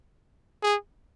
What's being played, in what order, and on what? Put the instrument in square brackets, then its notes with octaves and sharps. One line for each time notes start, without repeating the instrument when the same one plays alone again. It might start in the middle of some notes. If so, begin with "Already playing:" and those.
[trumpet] G#4